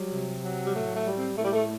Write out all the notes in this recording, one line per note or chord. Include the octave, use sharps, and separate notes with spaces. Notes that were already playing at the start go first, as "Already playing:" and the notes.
Already playing: F#3 G3
C3
F#3
G3
A2 A3
A3
G3
C4
A2 A3
G3
A3